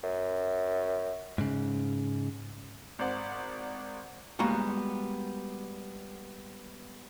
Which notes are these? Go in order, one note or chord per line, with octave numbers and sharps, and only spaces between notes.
F#2
G#2 C#3
G#1 C5 D5 F#5
G3 G#3 A#3 B3 F#4